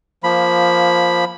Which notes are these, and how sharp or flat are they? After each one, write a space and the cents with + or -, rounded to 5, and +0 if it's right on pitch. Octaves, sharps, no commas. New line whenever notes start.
F3 +0 A#3 +10 B5 +0